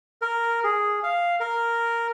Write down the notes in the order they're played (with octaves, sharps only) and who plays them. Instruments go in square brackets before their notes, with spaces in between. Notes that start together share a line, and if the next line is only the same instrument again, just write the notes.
[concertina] A#4
G#4
F5
A#4